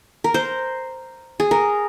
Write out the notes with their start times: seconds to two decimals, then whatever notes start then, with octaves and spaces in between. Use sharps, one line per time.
0.24 A#4
0.34 C5
1.40 G#4
1.51 A#4